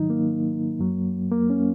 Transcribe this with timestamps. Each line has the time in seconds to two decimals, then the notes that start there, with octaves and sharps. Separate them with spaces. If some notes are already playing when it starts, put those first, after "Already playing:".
Already playing: G#2 D#3 F#3 D#4
0.10 A#3
0.79 F#2 F#3
1.31 A#3
1.50 C#4